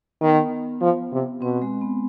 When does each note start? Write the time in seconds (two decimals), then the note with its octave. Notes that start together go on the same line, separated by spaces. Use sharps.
0.21 D#3 B3
0.82 F3
1.12 C3
1.42 B2 C4
1.62 G#3
1.81 B3